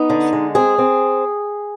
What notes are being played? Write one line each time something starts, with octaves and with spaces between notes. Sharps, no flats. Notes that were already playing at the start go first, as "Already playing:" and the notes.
Already playing: B3 D#4
D3
G#3
C4 G#4
C4